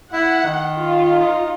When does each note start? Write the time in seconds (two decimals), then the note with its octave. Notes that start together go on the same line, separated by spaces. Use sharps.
0.13 E4 F#5
0.43 D#3
0.76 F4
1.19 D#4